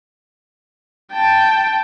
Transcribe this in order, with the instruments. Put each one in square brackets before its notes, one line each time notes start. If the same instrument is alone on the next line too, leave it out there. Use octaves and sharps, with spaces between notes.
[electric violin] G5 A5